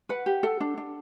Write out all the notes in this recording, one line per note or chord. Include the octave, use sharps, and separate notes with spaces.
B4 F#5
G4
A4 F#5
D4
D4